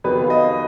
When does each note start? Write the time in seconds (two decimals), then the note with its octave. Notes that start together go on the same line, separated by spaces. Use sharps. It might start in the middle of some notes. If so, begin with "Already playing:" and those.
0.04 F2 D#3 F#3 B3 B4
0.22 F5
0.30 D#5